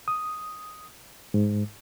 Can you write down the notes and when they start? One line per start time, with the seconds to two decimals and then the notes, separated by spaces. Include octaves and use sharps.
0.08 D#6
1.34 G#2